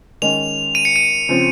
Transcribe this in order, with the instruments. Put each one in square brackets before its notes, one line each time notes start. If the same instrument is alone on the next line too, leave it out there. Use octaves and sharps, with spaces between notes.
[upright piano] D#3 G#3 C#4 [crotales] F7
[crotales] D#7
C#7
D#7
[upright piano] C#3 F3 C4